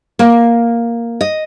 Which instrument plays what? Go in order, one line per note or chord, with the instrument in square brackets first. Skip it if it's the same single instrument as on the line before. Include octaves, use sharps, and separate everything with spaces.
[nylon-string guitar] A#3
D#5